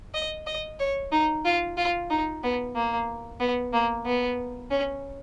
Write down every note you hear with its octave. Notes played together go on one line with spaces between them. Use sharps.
D#5
D#5
C#5
D#4
F4
F4
D#4
B3
A#3
B3
A#3
B3
C#4